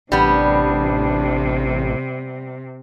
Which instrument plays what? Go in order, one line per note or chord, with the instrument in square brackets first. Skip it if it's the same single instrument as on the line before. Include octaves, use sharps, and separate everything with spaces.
[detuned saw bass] A1 [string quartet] C3 [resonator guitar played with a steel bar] G3 B3 [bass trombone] D4